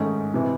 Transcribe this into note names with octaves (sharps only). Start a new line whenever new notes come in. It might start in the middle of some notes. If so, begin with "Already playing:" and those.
Already playing: G#2 D#3 A3 C#4
C3 E3